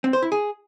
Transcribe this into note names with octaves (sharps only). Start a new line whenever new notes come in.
C4
C5
E4
G#4